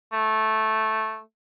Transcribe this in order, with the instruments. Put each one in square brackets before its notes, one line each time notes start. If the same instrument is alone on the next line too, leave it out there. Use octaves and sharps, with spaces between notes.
[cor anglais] A3